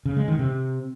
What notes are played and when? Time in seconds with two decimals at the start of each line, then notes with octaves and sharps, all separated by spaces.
0.05 C#3
0.17 G#3
0.28 D#3
0.39 C3